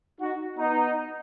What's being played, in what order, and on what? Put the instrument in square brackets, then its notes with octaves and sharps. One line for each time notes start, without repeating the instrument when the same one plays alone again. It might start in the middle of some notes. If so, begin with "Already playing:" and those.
[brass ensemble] D#4 F#4
B3 D#4